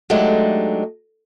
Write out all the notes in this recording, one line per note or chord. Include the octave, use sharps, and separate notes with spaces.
F#3 G#3 A3 D4 D#4 G4